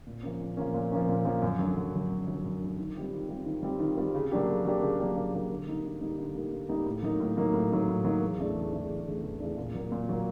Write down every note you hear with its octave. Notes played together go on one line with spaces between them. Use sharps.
A#2
F3 A#3 C#4
A#2
F3 A#3 C#4
A#2
F3 A#3 C#4
A#2
F3 A#3 C#4
F#2
D3 F#3
F#2
D3 F#3
F#2
D3 F#3
F#2
D3 F#3
D#3
G3 C4 F4
D#3
G3 C4 F4
D#3
G3 C4 F4
D#3
G3 C4 F4
C#3
F#3 A#3 D4 G4
C#3
F#3 A#3 D4 G4
C#3
F#3 A#3 D4 G4
C#3
F#3 A#3 D4 G4
D3
G3 A#3 D#4
D3
G3 A#3 D#4
D3
G3 A#3 D#4
D3
G3 A#3 D#4
A2
F#3 A#3 D#4
A2
F#3 A#3 D#4
A2
F#3 A#3 D#4
A2
F#3 A#3 D#4
E2
C#3 E3 A3 D4
E2
C#3 E3 A3 D4
E2
C#3 E3 A3 D4
E2
C#3 E3 A3 D4
A#2
F#3 A#3
A#2
F#3 A#3